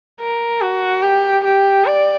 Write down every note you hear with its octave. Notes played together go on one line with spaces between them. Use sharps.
A#4
F#4
G4
G4
D5